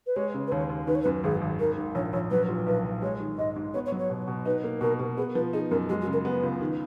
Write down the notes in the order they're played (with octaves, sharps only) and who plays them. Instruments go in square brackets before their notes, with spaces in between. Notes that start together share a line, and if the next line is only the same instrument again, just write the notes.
[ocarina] B4
[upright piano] G#3 [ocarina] C#5
[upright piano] C#3
[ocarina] B4
[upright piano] D#2 [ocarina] C#5
[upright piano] D#2
[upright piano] D#3 [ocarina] B4
[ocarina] C#5
B4
[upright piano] F#2
[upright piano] G#1 [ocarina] G#4
[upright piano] G#1
[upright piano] D#3 [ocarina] A#4
[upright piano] G#2
[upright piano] A#1 [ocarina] C#5
[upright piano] A#1 [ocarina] C#5
[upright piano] F#3 [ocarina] B4
[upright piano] A#2
[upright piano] B1 [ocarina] B4
[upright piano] B1
[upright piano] G#3 [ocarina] C#5
[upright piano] D#3
[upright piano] G#2 [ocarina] D#5
[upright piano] G#2
[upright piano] B3 [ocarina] C#5
[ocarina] C#5
[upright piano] F#3
[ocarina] C#5
[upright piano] B2
B2
[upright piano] D#4 [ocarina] B4
[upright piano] A#3
[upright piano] B2 [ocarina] A#4
[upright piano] B2
[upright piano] B3 [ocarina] G#4
[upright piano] F3 [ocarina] B4
[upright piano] D#4 [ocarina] G#4
[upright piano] F#2 [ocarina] A#4
[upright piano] G#3 [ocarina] F#4
[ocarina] F#4
[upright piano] C#3
[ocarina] A#4
[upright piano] B3 [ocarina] B4
[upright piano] C#2
D#3